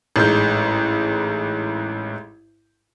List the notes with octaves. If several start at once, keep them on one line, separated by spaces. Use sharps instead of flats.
A1 G#2 G6